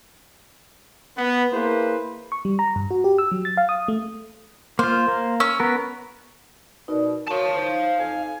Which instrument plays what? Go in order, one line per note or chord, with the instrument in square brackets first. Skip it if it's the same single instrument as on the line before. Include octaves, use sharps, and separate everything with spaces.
[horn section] B3
A#3 E4 G#4 B4 C5
[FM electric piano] C#6
G3
A#5
G2
F#4
G4
E6
F#3
A6
F5
D#6
A3
[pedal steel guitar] A#3 F4 [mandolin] C5
[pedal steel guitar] A#3
[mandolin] C#4 E6
[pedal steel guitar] B3 A#4
[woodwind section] B2 [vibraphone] D#4 A#4 D5
[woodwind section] D3 F#4 [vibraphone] A#4 C#5 C#6 [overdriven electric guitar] F5 A5
[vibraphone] D#4 [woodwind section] C5
[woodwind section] F2 G#5